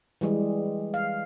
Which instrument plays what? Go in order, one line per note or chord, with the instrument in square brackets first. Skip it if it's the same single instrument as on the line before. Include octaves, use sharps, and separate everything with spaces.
[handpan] E3 G3 G#3
F5